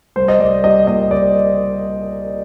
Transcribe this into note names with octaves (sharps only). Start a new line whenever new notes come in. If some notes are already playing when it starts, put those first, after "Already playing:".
C2 C5
D#5
C2 D5
G3 D#5
A#2 D#5
C2 D5